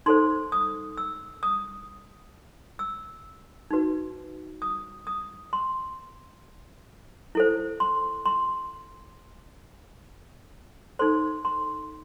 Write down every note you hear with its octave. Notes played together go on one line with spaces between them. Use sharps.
D#4 A4 C5 C6
D#6
E6
D#6
E6
D#4 F#4 B4
D#6
D#6
C6
E4 A4 C5
C6
C6
D#4 A4 C5 C6
C6